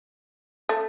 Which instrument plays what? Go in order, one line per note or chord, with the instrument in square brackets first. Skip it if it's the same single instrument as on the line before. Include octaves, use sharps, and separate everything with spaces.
[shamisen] A3